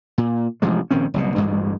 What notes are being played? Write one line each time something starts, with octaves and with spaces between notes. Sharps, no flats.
A#2
A1 C3 F3 G#3
A#1 D#3 C4 C#4
F#1 C2 B2
A1 D2 G2 G#3